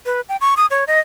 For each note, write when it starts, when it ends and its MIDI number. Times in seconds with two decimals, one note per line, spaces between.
0.06 0.21 71
0.29 0.37 79
0.41 0.54 85
0.57 0.66 87
0.71 0.84 73
0.87 1.00 75